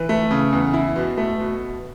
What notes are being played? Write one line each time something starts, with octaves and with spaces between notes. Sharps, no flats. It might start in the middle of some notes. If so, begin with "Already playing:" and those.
Already playing: E3
A3
C#3
E2
E4
B2
A3
B2